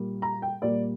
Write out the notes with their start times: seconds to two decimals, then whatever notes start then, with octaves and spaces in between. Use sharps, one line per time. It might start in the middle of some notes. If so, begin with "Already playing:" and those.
Already playing: A#2 G3 A#3
0.22 A#5
0.42 G5
0.62 A#2 G3 A#3 D5